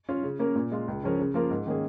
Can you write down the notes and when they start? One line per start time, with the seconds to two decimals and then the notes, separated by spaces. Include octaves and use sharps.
0.09 C#4 F4
0.23 C#3
0.39 A#3 C#4 A#4
0.55 A#2
0.71 G#3 F4
0.88 C#2
1.03 C#3 F3 C#4 A#4
1.19 C#3
1.34 F3 A#3 F4 A#4
1.50 G#2
1.67 D#3 A#3 C#4 G#4